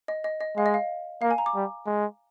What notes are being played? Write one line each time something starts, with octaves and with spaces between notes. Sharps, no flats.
D#5
D#5
D#5
G#3 F5
D#5
F5
A#3 F5
G#5
A#5
D6
G3
G#3